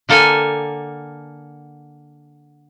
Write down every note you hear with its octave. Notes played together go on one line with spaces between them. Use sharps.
D3 A#3 A4 G5 G#5